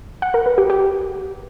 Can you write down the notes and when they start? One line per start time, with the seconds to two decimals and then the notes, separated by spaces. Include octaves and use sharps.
0.22 F#5
0.34 A#4
0.46 B4
0.58 G4
0.70 G4